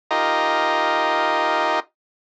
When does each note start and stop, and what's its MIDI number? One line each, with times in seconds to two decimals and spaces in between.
0.11 1.80 63
0.11 1.80 65
0.11 1.80 67
0.11 1.80 70
0.11 1.80 75